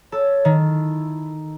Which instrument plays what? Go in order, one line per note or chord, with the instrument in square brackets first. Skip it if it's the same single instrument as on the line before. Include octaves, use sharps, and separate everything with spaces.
[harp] A4 [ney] C#5
[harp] D#3
[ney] E4